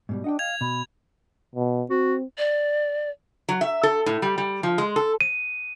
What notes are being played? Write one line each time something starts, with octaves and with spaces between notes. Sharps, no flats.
G#2 B2 G3
D4 D#5 F#5 G5
F5 G#6 F7
B2 B5
B2
C4 F#4
D5
F#3
E5
A4
A2
G3
G3
F3
G#3
A4
D#7